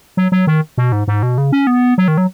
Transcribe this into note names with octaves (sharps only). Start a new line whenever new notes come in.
F#3
F#3
D#3
B2
G#2
G#2
B2
C#3
C#4
B3
F#3
D#3
F#3